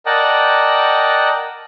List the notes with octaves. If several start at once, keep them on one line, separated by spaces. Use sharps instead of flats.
A#4 D5 D#5 F#5 G5 A5